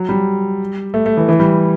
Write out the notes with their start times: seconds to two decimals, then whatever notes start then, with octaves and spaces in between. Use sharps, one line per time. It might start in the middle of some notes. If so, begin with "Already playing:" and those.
Already playing: F#3
0.09 G3
0.94 A3
1.06 A3
1.17 E3
1.29 E3
1.39 G3